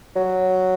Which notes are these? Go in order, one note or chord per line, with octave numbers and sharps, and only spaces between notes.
F#3